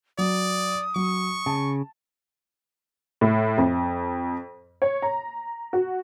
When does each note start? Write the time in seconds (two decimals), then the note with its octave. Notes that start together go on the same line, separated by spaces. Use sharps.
0.18 F#3 D5 D#6
0.96 F#3 C#6
1.46 C#3 A5
3.21 A2
3.58 F2
4.82 C#5
5.02 A#5
5.73 F#4